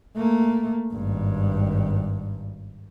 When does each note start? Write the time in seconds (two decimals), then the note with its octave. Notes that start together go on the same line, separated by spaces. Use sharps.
0.17 A3 A#3
0.92 G#1 G2